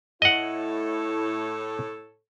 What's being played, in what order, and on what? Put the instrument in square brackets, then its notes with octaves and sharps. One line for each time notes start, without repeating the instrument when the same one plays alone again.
[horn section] A2 A4 C#5 [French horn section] E4 [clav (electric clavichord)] D#5 F#5